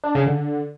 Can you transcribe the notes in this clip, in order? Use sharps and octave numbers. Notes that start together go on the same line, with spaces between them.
D4
C#3
D3